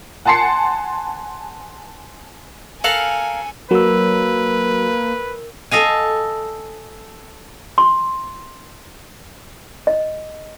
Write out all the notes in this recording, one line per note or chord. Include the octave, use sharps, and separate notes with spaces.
F#5 G#5 A5 C6 C7 C#7
A4 A#4 F5 F#5 G#5 F6
F#3 A#3 A#4 B4 E6
A4 D#5 F5 G#5
C6
D#5